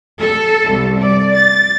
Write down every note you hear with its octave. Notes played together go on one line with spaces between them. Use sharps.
A4
C2
D5
A6